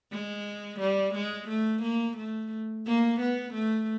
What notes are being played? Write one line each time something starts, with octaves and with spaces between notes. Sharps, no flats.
G#3
G3
G#3
A3
A#3
A3
A#3
B3
A3